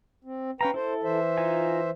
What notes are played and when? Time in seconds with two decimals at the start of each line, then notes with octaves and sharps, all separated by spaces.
0.24 C4
0.61 C#4 B4 F5 G5 A#5
0.74 E4 A4 C5
1.03 E3 C5 E5
1.37 D#4 F4 G#5